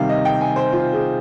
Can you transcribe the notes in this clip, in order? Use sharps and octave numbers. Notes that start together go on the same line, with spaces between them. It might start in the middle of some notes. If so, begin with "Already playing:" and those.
Already playing: C3 D#3 G3 F5
D#5
G5
G#5
C5
F4
G#4